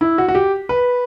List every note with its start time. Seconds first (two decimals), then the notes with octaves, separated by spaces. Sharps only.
0.01 E4
0.18 F#4
0.28 F#4
0.35 G4
0.69 B4